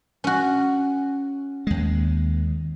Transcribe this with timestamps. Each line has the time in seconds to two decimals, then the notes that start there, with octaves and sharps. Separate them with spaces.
0.24 C#4 F#4
1.67 D#2 G#3